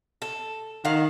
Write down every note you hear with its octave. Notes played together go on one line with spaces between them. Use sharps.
A4
D#3 F5 F#5